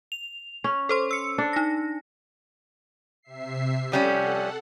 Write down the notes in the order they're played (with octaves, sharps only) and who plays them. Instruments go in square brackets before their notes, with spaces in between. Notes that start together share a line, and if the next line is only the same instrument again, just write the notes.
[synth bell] F7
[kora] C#4
[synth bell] A4 C5 C6
E6 C#7
[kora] D4
[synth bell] D#4 A#6
[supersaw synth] C3 E5 C7
[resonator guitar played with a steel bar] F3 G3 C#4 [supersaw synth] A4 F#5